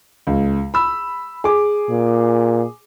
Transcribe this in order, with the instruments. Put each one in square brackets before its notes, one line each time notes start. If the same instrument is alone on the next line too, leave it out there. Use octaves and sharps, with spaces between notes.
[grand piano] C#2
B5 E6
G#4 D6
[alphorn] A#2